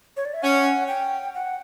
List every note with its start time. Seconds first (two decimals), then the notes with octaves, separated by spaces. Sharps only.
0.17 C#5
0.25 D5
0.34 E5
0.43 C#4 F#5
0.88 G5
1.34 F#5